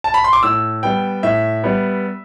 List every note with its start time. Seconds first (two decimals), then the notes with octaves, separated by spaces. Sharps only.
0.04 A5
0.14 B5
0.24 C6
0.33 D6
0.43 A2 E6
0.83 G3 B3 G5
1.23 A2 E5
1.64 G3 B3